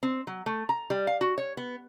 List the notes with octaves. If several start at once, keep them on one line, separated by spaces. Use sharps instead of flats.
C4
F#3
A3
A#5
G3
F5
F#4
C#5
B3